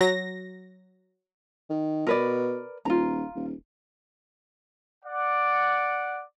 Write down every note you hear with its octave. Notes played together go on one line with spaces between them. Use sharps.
F#3 A#6
D#3
B2 A#4 B4 D5
D#1 F4 A#5
D#1
D5 F#5